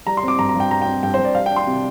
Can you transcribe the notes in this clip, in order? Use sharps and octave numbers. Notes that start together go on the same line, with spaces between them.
G3 A#5
C6
C4 D6
G2 A#5
A#5
G2
G5
G3 A#5
G5
C4
G2 G5
C5
G2
D5
G3 F5
G5
D4
C6
C3